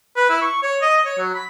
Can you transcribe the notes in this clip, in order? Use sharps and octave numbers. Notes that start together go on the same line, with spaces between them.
B4
E4
C#6
C#5
D#5
C#5
F#3
B5